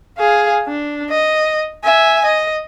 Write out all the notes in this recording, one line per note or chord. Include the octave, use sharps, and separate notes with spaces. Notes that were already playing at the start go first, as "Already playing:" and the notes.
G#4 F5
D4
D#5
E5 G#5
D#5